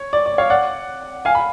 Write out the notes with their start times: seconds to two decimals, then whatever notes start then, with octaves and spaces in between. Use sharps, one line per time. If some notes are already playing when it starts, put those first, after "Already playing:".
Already playing: C#5
0.13 D5
0.26 D5
0.38 C#5 F5
0.50 D5 F#5
1.25 F5 G#5
1.35 B5